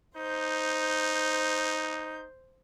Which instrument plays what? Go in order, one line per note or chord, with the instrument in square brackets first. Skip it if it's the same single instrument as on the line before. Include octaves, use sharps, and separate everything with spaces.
[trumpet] D#4 [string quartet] C5 G6